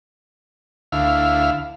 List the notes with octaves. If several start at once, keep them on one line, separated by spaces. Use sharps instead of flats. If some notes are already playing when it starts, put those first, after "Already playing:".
D2 E4 F5